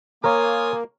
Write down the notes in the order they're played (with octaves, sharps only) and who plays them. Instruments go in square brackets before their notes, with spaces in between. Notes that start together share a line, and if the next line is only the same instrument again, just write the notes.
[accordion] A#3 [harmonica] F4 G#5 D#6 [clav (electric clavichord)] A#4 C#5